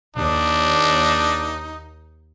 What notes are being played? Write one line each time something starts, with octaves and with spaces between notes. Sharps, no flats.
D#2 D4 D#4